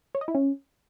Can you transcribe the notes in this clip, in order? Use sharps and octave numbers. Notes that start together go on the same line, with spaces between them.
C#5
D#5
E4
C#4